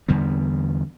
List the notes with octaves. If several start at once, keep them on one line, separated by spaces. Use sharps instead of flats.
E2 D3 G3 B3